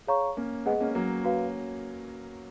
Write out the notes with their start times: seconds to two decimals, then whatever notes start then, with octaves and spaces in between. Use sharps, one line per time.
0.07 G#4 C#5 F5 A#5 C#6
0.37 A#3 C#4
0.66 G#3 B3 G#4 D#5 F#5
0.80 A#3 C#4
0.95 F#3 A#3
1.24 F#4 B4 F5